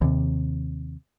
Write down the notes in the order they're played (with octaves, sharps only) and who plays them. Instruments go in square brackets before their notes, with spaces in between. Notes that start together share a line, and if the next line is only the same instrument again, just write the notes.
[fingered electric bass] D#2 C3